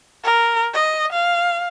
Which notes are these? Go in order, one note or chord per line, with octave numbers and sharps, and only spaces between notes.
A#4
D#5
F5